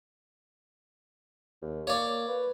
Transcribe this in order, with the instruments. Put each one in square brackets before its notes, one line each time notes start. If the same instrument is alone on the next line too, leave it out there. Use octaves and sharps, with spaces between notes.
[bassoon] D#2
[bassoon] A#3 [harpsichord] C#5 D5
[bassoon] B4